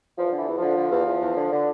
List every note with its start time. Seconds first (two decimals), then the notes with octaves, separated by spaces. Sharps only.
0.17 E2 F3
0.32 D3
0.38 E3
0.48 E2
0.57 F3
0.62 D3
0.78 D3
0.91 E2
1.06 E2
1.21 E2
1.36 D3
1.52 D3